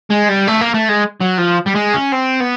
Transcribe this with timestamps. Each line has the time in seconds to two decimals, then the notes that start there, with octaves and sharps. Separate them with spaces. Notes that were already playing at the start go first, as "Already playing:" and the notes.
0.10 G#3
0.29 G3
0.47 A3
0.61 A#3
0.74 A3
0.89 G#3
1.21 F#3
1.39 F3
1.67 G3
1.76 G#3
1.94 C#4
2.13 C4
2.40 B3